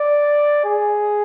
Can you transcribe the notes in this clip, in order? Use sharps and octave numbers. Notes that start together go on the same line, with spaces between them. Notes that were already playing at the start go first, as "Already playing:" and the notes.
Already playing: D5
G#4